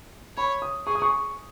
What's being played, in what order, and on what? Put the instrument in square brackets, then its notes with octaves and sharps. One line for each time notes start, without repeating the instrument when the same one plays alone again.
[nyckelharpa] C#5 [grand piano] B5
[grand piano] D#6
[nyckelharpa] G#4 [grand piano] C#6
[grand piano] D#6
C#6